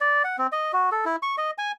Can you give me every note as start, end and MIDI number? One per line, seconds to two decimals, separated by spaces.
0.01 0.23 74
0.24 0.36 78
0.38 0.47 60
0.52 0.72 75
0.73 0.90 66
0.92 1.05 69
1.05 1.16 64
1.23 1.36 85
1.38 1.51 75
1.58 1.72 80